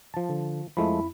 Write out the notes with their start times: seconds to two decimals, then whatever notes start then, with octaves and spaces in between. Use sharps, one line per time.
0.14 F3 A5
0.29 D3
0.77 F2 F3 G#3 A3 E4 B5